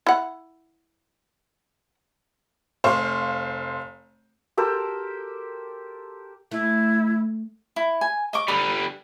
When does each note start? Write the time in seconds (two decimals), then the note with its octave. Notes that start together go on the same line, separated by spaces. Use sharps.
0.07 E4 F#5
2.84 F1 C5 F5 C#6
4.57 G4 A4 A#4 C5
6.51 A3 E4
7.76 E4
8.01 G#5
8.33 D#5 C#6 D6
8.48 D3 G3 B5 D#6